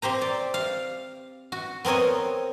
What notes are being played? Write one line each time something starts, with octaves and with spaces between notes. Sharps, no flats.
C4 G4 C5 A#5
D5
F5
F#4
B3 C4 A#4 C#5 D#5